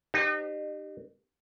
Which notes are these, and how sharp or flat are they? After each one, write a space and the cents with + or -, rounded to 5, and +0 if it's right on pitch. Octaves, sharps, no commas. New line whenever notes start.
D#4 -35 G4 +0 C5 +0